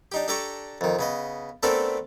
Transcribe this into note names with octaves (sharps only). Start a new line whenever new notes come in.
D4 D#4 G4
D4 G4 A4 D5 A#5 C#6
F2 D#3
C#3 B3 D#5
A3 B3 C4 D4 A4 A#4